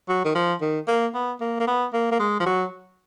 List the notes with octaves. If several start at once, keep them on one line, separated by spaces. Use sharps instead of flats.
F#3
D#3
F3
D#3
A#3
B3
A#3
A#3
B3
A#3
A#3
G#3
F3
F#3